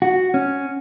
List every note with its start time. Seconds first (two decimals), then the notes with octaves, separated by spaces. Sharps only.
0.02 F#4
0.34 C#4